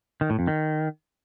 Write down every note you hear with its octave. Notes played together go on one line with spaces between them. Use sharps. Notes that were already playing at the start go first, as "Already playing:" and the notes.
D#3
A2
F2
D#3